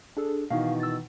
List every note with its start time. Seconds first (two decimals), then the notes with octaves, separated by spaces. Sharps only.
0.17 D4 G#4 A4
0.50 B2 D#3 E3 F5
0.80 E6 A6